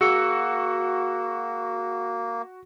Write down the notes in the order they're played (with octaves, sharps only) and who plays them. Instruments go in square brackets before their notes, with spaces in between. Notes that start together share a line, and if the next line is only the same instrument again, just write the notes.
[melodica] A#3 [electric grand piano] F#4 [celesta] G#4 E6 C#7